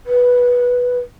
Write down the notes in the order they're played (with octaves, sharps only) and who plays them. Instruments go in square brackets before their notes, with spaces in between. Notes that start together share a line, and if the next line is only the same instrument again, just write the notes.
[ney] B4